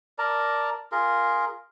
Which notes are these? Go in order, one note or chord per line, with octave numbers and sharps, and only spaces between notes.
A#4 D5 A5 A#5
F4 G#4 A#4